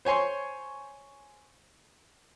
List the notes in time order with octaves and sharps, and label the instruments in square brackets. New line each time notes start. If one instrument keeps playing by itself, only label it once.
[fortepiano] C5 C#5 G#5 C6 C#6